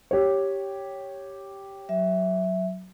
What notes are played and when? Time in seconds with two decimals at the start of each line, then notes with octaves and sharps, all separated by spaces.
0.11 G4 C#5
1.89 F#3 E5